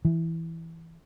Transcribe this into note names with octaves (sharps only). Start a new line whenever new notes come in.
E3